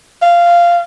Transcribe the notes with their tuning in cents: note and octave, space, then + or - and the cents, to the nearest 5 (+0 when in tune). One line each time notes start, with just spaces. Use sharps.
F5 -10